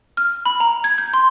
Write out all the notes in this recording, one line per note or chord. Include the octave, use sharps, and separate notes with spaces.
F6
B5
A#5
G#6
G6
C6